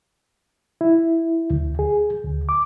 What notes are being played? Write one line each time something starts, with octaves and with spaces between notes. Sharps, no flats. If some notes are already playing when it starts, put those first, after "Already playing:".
E4
D2
G#4
D2
D6